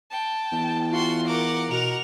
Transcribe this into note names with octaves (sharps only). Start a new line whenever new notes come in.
G5 A5
E2
F4 F#4 C6
A#4 F#5 D6
B2 A#4 F#5 F7